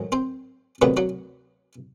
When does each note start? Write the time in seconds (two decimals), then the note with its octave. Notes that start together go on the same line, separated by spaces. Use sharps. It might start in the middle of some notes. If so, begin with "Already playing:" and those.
Already playing: A1 G#2 D#3 F#3
0.12 C4 C5
0.82 D2 C3 D#3 F#3 B3 B4
0.97 F#3 F#4